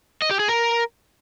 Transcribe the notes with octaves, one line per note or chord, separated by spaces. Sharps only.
D#5
G4
G#4
A#4